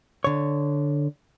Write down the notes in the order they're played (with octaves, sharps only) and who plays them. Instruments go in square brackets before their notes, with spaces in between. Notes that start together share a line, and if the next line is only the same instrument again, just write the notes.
[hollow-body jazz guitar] D3 C#5